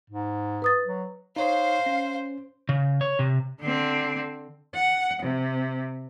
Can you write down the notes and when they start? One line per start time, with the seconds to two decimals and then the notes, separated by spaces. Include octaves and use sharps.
0.10 G#2
0.62 B4 D#6 A6
0.86 F#3
1.36 D#4 C5 C#5 D#5 F5
1.86 C#4
2.69 C#3
3.01 C#5
3.19 C3
3.61 D3 C4
4.75 F#5
5.23 C3